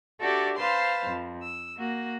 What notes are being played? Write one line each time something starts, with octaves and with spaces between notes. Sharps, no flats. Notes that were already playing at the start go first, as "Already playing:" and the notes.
D4 F#4 G4 A4 D5 E5
B4 C5 F5 A5 C6
F2
E6
A#3 F#4